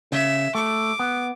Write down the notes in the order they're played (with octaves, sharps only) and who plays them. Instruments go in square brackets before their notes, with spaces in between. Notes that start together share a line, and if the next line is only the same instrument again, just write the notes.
[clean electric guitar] C#3 [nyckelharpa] E5
[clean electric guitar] A3 [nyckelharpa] D6
[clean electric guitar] B3